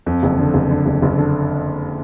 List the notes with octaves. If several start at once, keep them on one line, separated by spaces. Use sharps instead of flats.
F2
F#1
D3
F#1
D3
F#1
F#1
D3